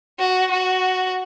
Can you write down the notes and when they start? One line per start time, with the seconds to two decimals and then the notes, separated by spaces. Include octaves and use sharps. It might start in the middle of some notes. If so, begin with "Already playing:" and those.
0.19 F#4
0.51 F#4